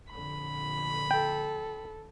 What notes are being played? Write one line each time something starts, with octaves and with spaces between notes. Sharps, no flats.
F2 A#2 D3 B5
A4 G5